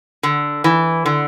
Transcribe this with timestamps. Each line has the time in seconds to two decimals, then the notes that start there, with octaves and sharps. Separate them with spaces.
0.23 D3
0.64 E3
1.06 D3